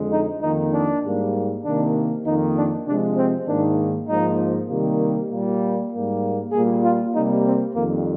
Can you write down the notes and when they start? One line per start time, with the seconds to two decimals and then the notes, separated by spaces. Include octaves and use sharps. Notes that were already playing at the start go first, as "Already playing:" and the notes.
Already playing: F2 D3 G#3
0.11 D#4
0.42 F2 D#3 A#3 D#4
0.73 D4
1.03 G#2 G3 A#3
1.64 C3 D#3 A#3 D4
2.25 F2 D#3 A#3 D#4
2.56 D4
2.86 C3 F3 G#3 D4
3.17 C4
3.47 G#2 D#3 A#3 D4
4.08 G#2 F3 A#3 D#4
4.69 C3 D#3 G3 A#3
5.30 A#2 G3 A#3
5.91 G#2 G3 A#3
6.52 A#2 G3 A#3 G#4
6.83 F4
7.13 C3 G3 A#3 D#4
7.44 C4
7.75 F2 D#3 G3 A#3